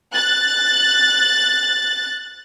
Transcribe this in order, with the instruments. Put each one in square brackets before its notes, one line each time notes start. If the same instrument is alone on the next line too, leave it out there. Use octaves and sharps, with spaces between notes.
[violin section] F#6 A6